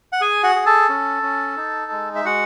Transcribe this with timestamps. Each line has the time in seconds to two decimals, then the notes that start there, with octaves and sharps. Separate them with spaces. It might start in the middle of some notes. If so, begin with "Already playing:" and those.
0.13 F#5
0.21 G#4 G#5
0.43 F#4 F#5
0.55 G#4
0.66 A4 A5
0.89 C#4
1.23 C#4
1.57 D#4
1.92 G#3
2.16 E5
2.25 G#3 F#4 F#5